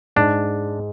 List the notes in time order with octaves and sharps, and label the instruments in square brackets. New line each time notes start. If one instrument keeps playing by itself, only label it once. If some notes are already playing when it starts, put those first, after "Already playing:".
[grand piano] G#2 [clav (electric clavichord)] D4